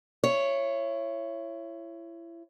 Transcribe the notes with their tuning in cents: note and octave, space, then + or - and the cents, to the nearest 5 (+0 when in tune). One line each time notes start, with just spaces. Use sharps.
E4 +30 C#5 -10